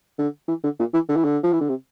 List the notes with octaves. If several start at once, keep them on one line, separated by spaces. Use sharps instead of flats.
D3
E3
D3
A#2
E3
D3
E3
D3
F3
E3
D3
C3